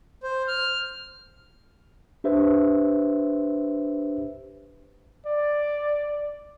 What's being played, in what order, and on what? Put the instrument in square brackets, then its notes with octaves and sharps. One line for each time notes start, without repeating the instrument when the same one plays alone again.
[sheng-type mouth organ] C5
F6
[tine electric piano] D4 G4 B4 C5 E5
[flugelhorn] D5